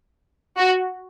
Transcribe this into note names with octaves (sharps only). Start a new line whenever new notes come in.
F#4